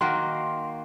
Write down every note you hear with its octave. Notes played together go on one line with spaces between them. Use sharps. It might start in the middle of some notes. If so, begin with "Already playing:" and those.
D#3 A#3 F#4 C6